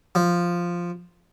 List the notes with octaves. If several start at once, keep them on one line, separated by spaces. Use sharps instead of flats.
F3